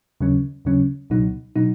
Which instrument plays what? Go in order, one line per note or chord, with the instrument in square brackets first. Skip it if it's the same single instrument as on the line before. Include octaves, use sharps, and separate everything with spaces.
[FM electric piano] D#2 C#3 F#3 C#4
D#2 C#3 F#3 C#4
C#2 B2 F#3 D#4
B2 F#3 D#4